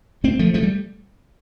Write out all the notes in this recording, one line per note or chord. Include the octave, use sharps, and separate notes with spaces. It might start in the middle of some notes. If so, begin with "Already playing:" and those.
A3 C4
F3 A3
F3 A3
G3